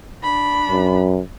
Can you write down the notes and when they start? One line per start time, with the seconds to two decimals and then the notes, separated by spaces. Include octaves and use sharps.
0.23 D4 B5
0.69 F#2